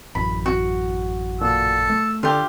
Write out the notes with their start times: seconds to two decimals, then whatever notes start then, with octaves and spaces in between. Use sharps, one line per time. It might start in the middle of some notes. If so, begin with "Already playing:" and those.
0.15 A1 F#2 B5
0.46 F#4
1.41 A#2 A4 E6
1.90 A3
2.23 D3 D4 F4 G4 A4